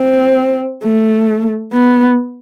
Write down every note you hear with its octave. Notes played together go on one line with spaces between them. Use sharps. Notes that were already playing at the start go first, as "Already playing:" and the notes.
Already playing: C4
A3
B3